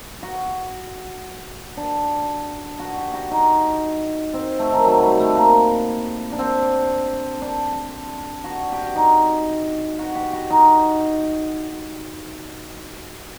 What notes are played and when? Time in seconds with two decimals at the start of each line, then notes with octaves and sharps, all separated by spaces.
0.23 F#4
1.77 D4
2.80 F#4
2.97 G4
3.13 F#4
3.31 D#4
4.34 C4
4.59 A3
4.72 D#3
4.85 F#3
5.02 G3
5.19 A3
5.37 A#3
6.32 D4
6.39 C4
7.42 D4
8.44 F#4
8.72 G4
8.84 F#4
8.96 D#4
9.99 F#4
10.15 G4
10.33 F#4
10.50 D#4